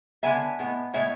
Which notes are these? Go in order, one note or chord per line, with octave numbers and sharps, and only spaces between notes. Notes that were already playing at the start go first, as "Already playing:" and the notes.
D3 G#3 B3 E5 G#5
A2 G#3 B3
A2 G#3 B3 C#5 E5